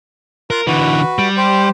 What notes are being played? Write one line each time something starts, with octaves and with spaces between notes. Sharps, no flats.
F4 A#4 F5 F#6
D3 E3 F#4 B4
G3
G4 C5